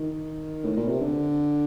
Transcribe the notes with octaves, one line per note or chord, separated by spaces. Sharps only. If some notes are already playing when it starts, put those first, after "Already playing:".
Already playing: D#3
A2
A#2
C3
D3